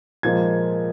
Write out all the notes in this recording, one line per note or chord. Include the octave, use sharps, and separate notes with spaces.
A#2 F3 G#3 G#6